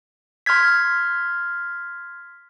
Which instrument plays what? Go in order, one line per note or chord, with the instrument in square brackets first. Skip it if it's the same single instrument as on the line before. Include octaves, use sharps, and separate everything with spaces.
[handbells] C6 F6 G6 G#6 B6